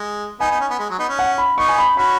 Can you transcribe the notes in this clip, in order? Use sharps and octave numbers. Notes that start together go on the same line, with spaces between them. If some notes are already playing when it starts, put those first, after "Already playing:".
Already playing: G#3
B3 D#4 G#5
B3 D#4
C#4
B3
G#3
F#3
B3 D#4
C#4
F#5
B5
B3 D#4 C#6
G#5
B5
C#4 F#4 B5